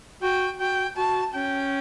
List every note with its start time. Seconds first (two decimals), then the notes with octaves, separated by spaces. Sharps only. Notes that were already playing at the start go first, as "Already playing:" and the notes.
0.22 F#4 G5
0.60 F#4 G5
0.97 F#4 A5
1.35 C#4 G5